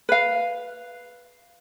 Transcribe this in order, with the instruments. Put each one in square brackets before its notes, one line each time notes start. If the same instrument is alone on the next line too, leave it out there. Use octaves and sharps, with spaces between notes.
[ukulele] B4 F5